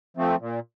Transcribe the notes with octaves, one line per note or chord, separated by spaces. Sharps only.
F3 A3 C4
A#2